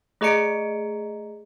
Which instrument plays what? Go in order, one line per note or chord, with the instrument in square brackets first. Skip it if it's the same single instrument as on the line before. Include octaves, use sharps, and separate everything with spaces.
[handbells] A3 G#4 D#5 A#5 C#7 D7